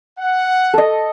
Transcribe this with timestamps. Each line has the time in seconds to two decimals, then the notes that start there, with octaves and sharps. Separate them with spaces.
0.19 F#5
0.74 A4 D#5